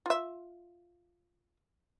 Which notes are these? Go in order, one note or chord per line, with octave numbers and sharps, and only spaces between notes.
F4 E5